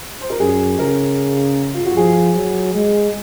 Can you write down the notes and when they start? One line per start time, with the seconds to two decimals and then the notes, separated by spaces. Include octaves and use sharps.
0.21 C5
0.30 A#4
0.40 F#2 G#4
0.79 C#3 A#4
1.74 F4
1.86 F#4
1.96 F3 G#4
2.35 F#3
2.75 G#3